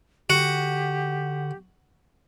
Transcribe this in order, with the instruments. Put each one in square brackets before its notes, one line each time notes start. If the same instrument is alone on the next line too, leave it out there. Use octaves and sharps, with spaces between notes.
[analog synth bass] D3 [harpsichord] F#4 F#5 [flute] G4